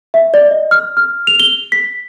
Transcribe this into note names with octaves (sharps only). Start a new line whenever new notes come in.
E5
D5
D#5
F6
F6
F7
G7
B6